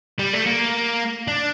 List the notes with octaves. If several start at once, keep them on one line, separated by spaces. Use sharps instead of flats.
G3
A3
A#3
D4